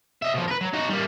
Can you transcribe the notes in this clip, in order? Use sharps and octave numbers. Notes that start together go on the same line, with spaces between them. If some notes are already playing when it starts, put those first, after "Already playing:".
D#5 E5
B2 F3
A#4 B4
F#3
D#4 F#4
G3 A#3